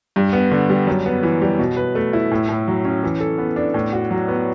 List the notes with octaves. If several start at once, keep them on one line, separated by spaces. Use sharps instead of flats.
G2
B3
D3
G3
F#2
B3
E3
G3
B2
B4
A3
E4
A2
A2
F#3
C#4
E3
A4
B3
D4
A2
F#4
F#3
B3